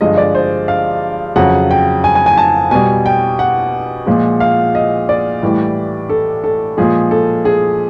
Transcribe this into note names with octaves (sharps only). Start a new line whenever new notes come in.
G2 D3 F3 G#3 D#5
D5
C5
F5
F2 C#3 F#3 F#5
G5
G#5
G#5
G#5
A5
B2 G3 G#5
G5
F#5
A#2 F3 G#3
F5
D#5
D5
A2 E3 G3
A4
A4
A#2 F3 G#3 G#4
A4
G#4